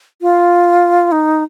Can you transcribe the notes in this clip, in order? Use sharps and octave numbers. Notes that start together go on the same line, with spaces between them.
F4
D#4